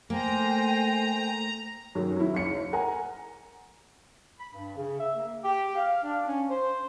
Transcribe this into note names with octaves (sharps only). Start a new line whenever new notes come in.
A3 A#3 C5 G5 G#5 A#5
F#2 D#3 F#3
F#3 E4
F#1 C#7
A#4 F#5 G#5 A#5
B5
G2
C#3
E5
A#3
G4
F5
D4
C#4
C5